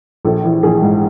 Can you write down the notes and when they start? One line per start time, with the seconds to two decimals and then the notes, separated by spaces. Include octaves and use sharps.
0.25 A#1 A4
0.44 E3
0.63 A#1 G#4
0.82 G#2